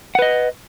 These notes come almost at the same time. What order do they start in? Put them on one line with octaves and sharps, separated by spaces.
F#5 B4 D#5